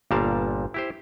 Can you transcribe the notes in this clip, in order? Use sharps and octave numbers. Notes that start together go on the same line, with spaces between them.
G1 A#2 G3 A#4 F5 A5
E4 G4 C5